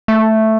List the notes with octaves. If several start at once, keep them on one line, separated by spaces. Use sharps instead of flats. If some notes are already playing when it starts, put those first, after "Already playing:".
A3